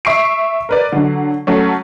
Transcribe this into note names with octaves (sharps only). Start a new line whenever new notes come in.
E5 C#6 C7 D7
A#4 B4 D5
D3 F#3
F#3 A3 C#4